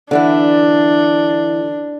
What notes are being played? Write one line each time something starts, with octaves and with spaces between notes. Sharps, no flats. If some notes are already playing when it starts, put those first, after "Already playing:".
D3 E3 D4 E4